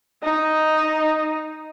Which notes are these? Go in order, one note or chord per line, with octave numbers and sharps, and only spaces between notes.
D#4